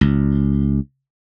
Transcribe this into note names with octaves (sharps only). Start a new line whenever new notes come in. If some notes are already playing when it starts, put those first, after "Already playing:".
C#2